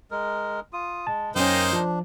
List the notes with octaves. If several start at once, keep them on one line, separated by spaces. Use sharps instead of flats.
G#3 A#4
F4 D#6
G#3 A5
F#2 A#3 C#4 D#4 C5 G5 D#6
F3 D4